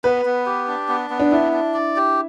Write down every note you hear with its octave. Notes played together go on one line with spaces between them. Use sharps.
B3 B4
B3
G4
D4
B3
B3
D4
D4 E4
D4
D5
G4